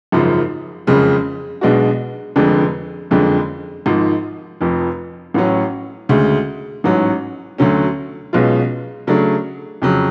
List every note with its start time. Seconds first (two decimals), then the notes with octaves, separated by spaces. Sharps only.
0.12 G#1 F#2 C#3 F3
0.87 F#1 F2 C#3 G#3
1.61 B1 B2 G#3 D4 F#4
2.36 F1 F2 D3 G#3 D4
3.11 F#1 F2 D3 G#3 D4
3.86 G#1 G#2 F3
4.61 F1 F2 F3
5.34 A1 A2 F#3 C#4
6.09 D2 C#3 G#3
6.84 A1 G#2 F#3 C#4
7.58 D2 D3 F#3 C#4
8.33 B1 B2 G#3 C#4 F4
9.07 C#3 F#3 A3 D4
9.82 F2 C#3 F#3